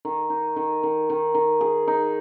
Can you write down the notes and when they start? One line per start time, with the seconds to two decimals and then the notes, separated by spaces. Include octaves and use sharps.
0.05 D#3
0.30 D#4
0.56 D#3
0.83 D#3
1.10 D#3
1.35 D#3
1.61 G#4
1.88 D#4